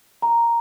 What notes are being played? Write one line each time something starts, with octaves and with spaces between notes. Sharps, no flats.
A#5